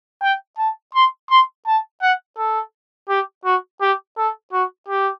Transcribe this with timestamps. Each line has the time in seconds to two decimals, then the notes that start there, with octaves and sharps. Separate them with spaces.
0.22 G5
0.58 A5
0.94 C6
1.30 C6
1.67 A5
2.02 F#5
2.38 A4
3.09 G4
3.45 F#4
3.81 G4
4.18 A4
4.53 F#4
4.88 G4